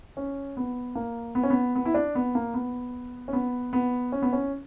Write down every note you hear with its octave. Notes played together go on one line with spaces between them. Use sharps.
C#4
B3
A#3
B3
C#4
B3
B3
E4
D4
B3
A#3
B3
C#4
B3
B3
C#4
B3
C#4